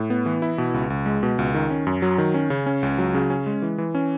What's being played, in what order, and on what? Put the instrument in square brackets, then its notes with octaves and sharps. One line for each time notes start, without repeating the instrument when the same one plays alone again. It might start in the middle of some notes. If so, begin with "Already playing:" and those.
Already playing: [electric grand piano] A2
B3
E3
E4
B2
C#2
C#2
G#3
B2
C#2
D#3
C#4
F#2
F#3
D#3
C#4
C#3
C#4
C#2
F#3
C#3
C#4
G#3
E3
E3
C#4